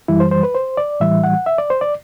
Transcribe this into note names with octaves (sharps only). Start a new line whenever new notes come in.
F#2 E3 G3 E4
C5
C5
B4
C5
D5
A2 E3 G3 E5
F#5
E5
D5
C5
D5